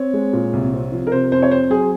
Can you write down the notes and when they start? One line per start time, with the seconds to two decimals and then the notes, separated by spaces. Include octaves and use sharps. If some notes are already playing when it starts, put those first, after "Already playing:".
Already playing: C4 C#5
0.14 G#3
0.33 A#2
0.53 C2
0.73 C4
0.92 F3
1.07 A#4
1.12 C3 C5
1.32 F2 C5
1.42 C#5
1.51 C4 C5
1.70 F#3 G#4